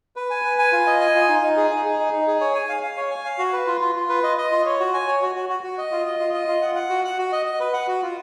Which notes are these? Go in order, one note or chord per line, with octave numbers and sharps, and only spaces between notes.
B4
G#5
B4
G#5
F4
D#5
G#5
F4
D#4
D#4
G#4
D#4
G#4
D#4
D#4
G#4
C#5
G#5
F5
F5
C#5
G#5
F5
F#4
B4
F4
F4
F4
B4
D#5
D#5
F4
C#5
F#4
G#5
C#5
F#4
F#4
F#4
F#4
D#5
F4
D#5
F4
D#5
F4
F#5
F#5
F#4
F#5
F#4
D#5
D#5
B4
F#5
F#4
F4